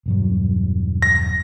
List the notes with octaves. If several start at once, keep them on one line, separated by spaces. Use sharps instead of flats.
E1 G2 F#3
A#6